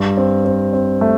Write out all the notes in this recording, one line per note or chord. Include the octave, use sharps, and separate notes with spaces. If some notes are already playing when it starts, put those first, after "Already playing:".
Already playing: G2
C4
C4
C4
A3